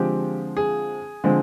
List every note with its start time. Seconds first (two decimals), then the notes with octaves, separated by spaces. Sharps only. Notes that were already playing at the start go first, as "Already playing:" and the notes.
Already playing: D3 F3 G#3 C4 G4
0.57 G#4
1.24 D3 F3 G#3 C4